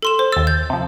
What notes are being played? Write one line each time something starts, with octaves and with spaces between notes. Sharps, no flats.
A4 C6 E7
C5
D#2 E6 A6
G6
C3 F3